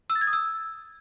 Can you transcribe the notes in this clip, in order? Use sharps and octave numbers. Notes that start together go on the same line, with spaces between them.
E6
A6
G#6
D#6
E6